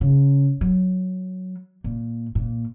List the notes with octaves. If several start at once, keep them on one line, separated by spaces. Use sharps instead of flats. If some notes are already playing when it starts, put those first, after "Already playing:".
C#3
F#3
A#2
A#2